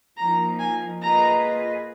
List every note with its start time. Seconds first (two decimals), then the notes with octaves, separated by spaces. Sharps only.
0.17 F3 A#3 D#4 A#5
0.60 G#5
1.02 A#3 F4 G#4 B4 D#5 A#5